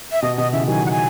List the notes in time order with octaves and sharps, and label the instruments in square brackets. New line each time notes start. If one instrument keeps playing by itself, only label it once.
[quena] E5
[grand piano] B2 [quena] D#5
[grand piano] B2 [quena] D#5
[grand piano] C#3 E3 [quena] E5
[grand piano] D#3 F#3 [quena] G#5
[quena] F#5
G#5